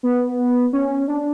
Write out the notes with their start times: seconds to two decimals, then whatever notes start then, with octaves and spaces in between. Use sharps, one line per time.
0.03 B3
0.73 C#4
1.08 D4